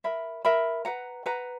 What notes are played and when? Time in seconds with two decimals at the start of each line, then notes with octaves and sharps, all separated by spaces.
0.04 A#4 E5 B5
0.45 A#4 E5 B5
0.85 B4 F#5 A#5
1.26 B4 F#5 A#5